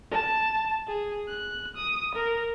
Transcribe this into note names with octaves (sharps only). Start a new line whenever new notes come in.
A5
G#4
F#6
D#6
A#4